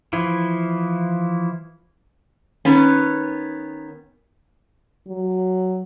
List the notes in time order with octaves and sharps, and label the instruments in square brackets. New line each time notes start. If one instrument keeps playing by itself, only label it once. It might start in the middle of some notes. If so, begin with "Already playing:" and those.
[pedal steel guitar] E3 F3 E4
[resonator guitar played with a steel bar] D#3 B3 C#4
[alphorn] F#3